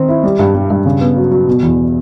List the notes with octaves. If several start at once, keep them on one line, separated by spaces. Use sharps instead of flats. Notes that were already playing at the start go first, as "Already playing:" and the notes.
Already playing: D#3 C4
E4
G3
G2
G3
G2
C#3
B3
F#3
F#3
B2
E2